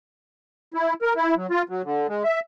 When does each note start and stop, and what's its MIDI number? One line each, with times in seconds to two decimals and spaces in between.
0.74 0.94 64
1.02 1.13 70
1.16 1.34 64
1.37 1.47 54
1.50 1.62 65
1.69 1.82 54
1.85 2.07 50
2.09 2.23 56
2.24 2.40 76